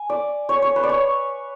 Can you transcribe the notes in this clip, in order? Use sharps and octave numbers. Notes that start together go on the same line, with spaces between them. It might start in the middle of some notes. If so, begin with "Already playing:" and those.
Already playing: G#5
D5
C#5
C#5
B4
D5
C#5